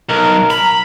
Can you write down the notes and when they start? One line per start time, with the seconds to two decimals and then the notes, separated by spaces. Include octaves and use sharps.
0.10 B1 A#4
0.50 A#5 B5